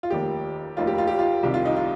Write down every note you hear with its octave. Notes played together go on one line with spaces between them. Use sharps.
F4
F1 D#2 D#3 G4
F1 D#2 D#3 F4
G4
F4
G4
F4
C2 C3 D#3 G4
F4
D#4
F4